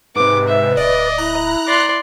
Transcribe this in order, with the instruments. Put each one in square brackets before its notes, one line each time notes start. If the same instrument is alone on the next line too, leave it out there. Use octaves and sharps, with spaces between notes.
[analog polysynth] G#2 C3 [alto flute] B4 [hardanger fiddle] D6
[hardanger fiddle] E5
[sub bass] D1 [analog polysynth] D5 [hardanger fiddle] D#5
[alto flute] E4 [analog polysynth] A#5 F#6
[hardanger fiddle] D5 C6